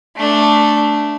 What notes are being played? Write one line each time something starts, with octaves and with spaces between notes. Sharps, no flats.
A3 D4